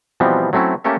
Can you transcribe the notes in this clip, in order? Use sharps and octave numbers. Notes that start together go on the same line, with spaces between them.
B2 E3 F3 G3 B3 C4
F#3 A3 C4 C#4 E4
A3 A#3 C#4 G4 A4 E5